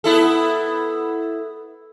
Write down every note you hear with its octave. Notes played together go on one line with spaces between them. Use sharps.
B3 E4 A4